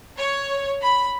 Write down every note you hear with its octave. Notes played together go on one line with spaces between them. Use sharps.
C#5
B5